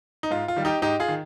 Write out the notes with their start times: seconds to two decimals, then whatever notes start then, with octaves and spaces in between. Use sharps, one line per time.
0.23 D#4
0.31 G#2 F4
0.48 F4
0.56 D#3 G3
0.65 D#4 G4
0.82 G#2 D#4 G4
1.00 F4 G#4
1.08 D#3